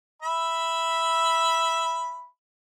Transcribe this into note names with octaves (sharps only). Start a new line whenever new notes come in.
E5 B5